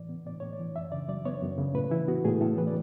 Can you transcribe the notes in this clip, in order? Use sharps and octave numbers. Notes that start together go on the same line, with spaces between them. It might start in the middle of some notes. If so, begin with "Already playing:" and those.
Already playing: A2 E3 D5
B3
A2 D5
A2 C#5
D5
E3
F#2 E5
C#3 D5
F#3 D5
B3 C#5
F#2
C#3
A2 B4
E3 E4
B3 F#4
A2 G#4
A2 A4
E3 B4
D5